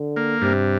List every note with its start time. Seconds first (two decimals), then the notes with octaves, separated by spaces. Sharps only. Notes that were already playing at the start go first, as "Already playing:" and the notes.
Already playing: D3
0.16 A#3
0.41 G2 C3